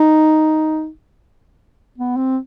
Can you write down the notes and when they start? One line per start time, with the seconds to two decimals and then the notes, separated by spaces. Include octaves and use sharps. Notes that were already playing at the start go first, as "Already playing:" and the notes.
Already playing: D#4
1.98 B3
2.17 C4